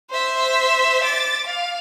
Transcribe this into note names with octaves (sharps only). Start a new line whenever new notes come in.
C5 E5
D6 A6
F5